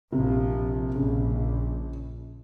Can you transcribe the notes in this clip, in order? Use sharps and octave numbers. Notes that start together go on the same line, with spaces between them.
A#1 C3 F3
A#1 C#3